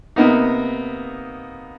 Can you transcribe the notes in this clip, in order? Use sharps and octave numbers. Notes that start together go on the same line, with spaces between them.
C3 A#3 B3 D#4